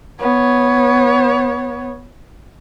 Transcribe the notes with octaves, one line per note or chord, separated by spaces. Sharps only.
B3 C#5